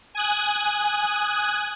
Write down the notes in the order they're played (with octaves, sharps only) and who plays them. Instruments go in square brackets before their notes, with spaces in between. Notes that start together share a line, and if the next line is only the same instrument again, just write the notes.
[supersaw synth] G#5 D#6 F#6